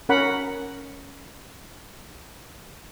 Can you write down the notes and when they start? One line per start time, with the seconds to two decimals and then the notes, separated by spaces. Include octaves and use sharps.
0.09 C#4 A#4 F#5 B5